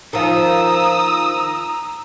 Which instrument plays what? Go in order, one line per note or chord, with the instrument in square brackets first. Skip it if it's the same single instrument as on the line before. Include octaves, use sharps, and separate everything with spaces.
[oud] D#3 F3 [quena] A#5 [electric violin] D#6 E6